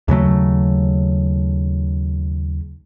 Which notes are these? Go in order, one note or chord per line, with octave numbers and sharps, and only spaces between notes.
D#2 C#3 F#3 A3